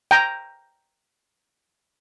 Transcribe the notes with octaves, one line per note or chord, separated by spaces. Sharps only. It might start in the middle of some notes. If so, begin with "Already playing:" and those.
G5 A#5